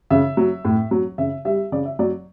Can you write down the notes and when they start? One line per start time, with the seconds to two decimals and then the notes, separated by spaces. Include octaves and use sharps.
0.10 C#3 E5
0.37 F#3
0.65 A2
0.91 F#3
1.18 C#3 E5
1.45 G3 E5
1.72 C#3 D5
1.85 E5
1.99 F#3 D5